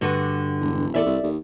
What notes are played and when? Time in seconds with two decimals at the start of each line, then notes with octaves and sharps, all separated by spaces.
0.01 G2 D3 F#4
0.60 E1
0.94 E2 A4 D5 E5
1.06 C2
1.23 D#2